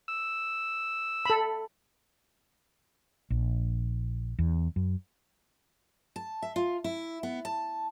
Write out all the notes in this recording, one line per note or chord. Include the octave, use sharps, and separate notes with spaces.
E6
A4 B5
A#1
E2
F#2
A5
E5
F4
E4
B3
A5